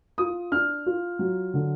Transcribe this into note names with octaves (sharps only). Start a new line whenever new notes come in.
F4 D#6
D4 F6
F4
F#3
D3